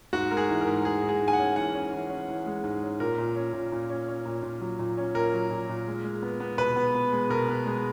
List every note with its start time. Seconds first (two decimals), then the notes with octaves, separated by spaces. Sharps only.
0.13 G#2 F#4
0.31 G#3 A#4
0.37 G#4
0.50 E3
0.61 A#4
0.67 G#2
0.85 G#2 G#4
1.03 G#2
1.09 G#4
1.21 G#2
1.28 G#5
1.33 F#5
1.39 C#4
1.56 E3 F#5
1.75 C#4
1.92 E3
2.10 C#4
2.28 E3
2.46 G#3
2.64 G#2
2.82 C#4
3.00 A#2 A#4
3.18 A#2
3.36 C#4
3.53 A#2
3.72 A#2
3.90 C#4
4.08 C#4
4.26 A#2
4.43 A#2
4.61 F#3
4.79 A#2
4.97 C#4
5.15 A#2 A#4
5.33 F#3
5.50 A#2
5.69 A#2
5.87 G#3
6.04 G#3
6.23 B3
6.40 B3
6.58 B2 B4
6.76 B3
6.95 B3
7.12 G#3
7.30 B2 A#4
7.48 B3
7.66 G#3